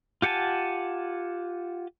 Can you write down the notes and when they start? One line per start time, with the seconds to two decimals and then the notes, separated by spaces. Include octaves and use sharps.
0.22 F4 G4 F#5 G#5 A5